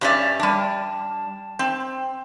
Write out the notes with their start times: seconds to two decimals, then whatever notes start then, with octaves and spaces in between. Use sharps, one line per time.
0.01 G2 G3 C#4 D#4 D5 E5
0.39 G3 D4
1.59 C4